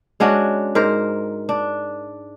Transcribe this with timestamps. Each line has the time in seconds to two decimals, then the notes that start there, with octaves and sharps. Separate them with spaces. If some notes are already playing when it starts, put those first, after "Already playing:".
0.20 G#3 C#4 D4 F#4
0.75 G#2 A#4 C5
1.49 D4